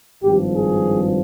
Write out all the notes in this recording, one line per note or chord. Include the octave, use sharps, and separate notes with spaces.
G#1 G2 F3 G4
G#4